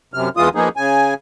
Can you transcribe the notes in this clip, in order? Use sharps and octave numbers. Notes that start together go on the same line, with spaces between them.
F#2 C3 F6
E2 E3 G#3 F4 D#6
F3 A#3 B3 D#4 G#4
C#3 G#5